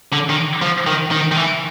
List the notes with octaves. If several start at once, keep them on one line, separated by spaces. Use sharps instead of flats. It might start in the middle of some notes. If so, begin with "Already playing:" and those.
D3
D#3
F3
D#3
D#3
D#3
E3